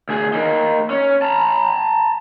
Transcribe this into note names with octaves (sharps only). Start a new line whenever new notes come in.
D2 G#4
A#3 D#4
C#4
A5 A#5